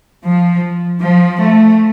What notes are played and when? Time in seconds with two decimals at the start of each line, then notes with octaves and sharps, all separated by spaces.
0.24 F3
1.02 F3
1.41 A3